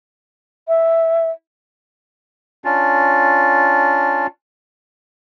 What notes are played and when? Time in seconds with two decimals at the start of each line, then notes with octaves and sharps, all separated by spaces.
0.68 E5
2.65 C#4 D4 F4